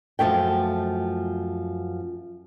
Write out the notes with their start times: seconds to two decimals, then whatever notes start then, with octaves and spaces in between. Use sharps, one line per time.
0.19 F#2 F3 A3 G5